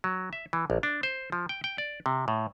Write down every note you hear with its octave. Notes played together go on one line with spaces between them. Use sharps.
F#3
E5
E3
A#1
D4
C5
F3
G5
G5
D5
C3
A2